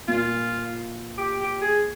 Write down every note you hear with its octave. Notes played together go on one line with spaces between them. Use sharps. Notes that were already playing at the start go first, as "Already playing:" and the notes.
A#2 F4
G4
G4
G#4